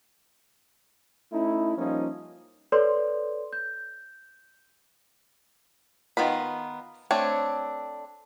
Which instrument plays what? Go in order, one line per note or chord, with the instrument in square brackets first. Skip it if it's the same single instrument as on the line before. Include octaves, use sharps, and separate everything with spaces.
[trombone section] A3 C#4 D#4 E4
F3 G3 A#3 C#4 D#4 F4
[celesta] A4 B4 C#5 D5 C6
G6
[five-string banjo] D#3 B3 F4 B5
A3 C4 D4 C#5